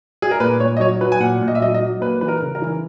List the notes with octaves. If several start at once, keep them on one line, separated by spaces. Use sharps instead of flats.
G#4
A#4
A#2 B4
A#2 C#5
D#5
F#3 C#5
F#3 B4
G#5
A#2 F#5
A#2
D#5
E5
F#3 D#5
D#5
F#3
A#3 B4
E3 B4
A#4
C#3
A#4
E3